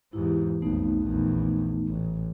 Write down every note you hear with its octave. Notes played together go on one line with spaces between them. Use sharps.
E2 G#2 E4 G4
B1 F2 A3 B3 D#4
A#1 E2
A1